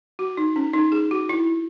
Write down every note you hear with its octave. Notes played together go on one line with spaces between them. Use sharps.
F#4
D#4
C#4
D#4
G#4
F#4
E4